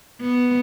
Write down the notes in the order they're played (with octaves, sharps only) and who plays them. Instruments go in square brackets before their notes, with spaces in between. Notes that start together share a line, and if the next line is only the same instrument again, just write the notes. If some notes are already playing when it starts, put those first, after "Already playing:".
[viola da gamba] B3